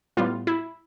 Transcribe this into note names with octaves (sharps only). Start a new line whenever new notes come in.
A2 G3 B3 F4
E4